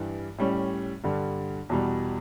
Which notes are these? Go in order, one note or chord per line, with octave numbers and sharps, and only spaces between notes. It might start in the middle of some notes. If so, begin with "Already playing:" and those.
Already playing: G2 E3 G3
A2 G3 C#4
G2 D3 G3
E2 B2 G3